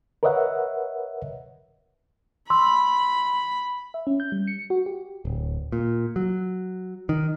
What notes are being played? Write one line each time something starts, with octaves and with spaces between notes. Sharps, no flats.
A#4 B4 C#5 D#5 E5 F#5
B5 C6 E6
E5
C#4
G6
G3
C#7
F#4
G4
D1
A#2
F#3
D#3